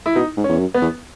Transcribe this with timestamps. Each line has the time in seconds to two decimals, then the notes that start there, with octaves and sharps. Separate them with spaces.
0.06 E4
0.15 B2 D#4
0.37 G#2
0.44 C#4
0.49 E2
0.59 F#2
0.74 B3
0.81 E2